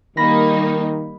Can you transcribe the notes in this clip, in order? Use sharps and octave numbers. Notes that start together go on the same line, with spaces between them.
D#3 G3 A#3 D#4 B5 A#6